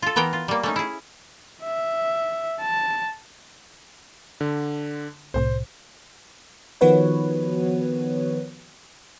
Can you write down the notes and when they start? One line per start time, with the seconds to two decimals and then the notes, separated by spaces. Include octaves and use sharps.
0.02 F4 A4
0.16 E3 B3 A#4 G5
0.33 F4
0.48 G3 A#3
0.63 A3 C#4 D#4
0.76 E4 G#4
1.63 E5
2.61 A5
4.41 D3
5.34 C2 A2 C3 C5
6.81 D#3 F3 B3 F#4 B4 C#5